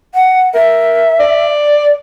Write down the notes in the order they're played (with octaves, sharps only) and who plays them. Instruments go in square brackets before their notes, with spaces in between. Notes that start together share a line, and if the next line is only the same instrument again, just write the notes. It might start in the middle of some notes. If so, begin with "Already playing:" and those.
[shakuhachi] F#5
[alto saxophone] A#4 [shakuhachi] E5
[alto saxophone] D5